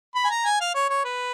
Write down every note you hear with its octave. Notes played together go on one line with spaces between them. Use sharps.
B5
G#5
A#5
G#5
F5
C#5
C#5
B4